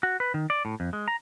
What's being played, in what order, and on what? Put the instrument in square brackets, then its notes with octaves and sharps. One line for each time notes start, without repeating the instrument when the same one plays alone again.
[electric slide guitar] F#4
B4
D#3
D5
A2
F2
G#3
A#5